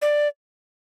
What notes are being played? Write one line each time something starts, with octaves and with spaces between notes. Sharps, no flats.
D5